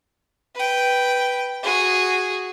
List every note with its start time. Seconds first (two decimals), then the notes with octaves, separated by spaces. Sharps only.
0.55 B4 G5
1.63 F#4 G#4